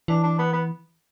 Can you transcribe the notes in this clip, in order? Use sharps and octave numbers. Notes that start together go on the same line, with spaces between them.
E3 D4
D4
B3
B3